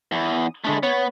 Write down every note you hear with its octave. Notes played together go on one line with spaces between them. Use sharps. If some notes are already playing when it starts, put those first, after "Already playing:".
E2 E3
D#6
D3 G#3 A3 D4 B5
B3 C#5